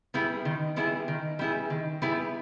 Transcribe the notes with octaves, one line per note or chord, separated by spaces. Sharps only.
G3 B3 E4 G#4
D#3
G3 B3 E4 G#4
D#3
G3 B3 E4 G#4
D#3
G3 B3 E4 G#4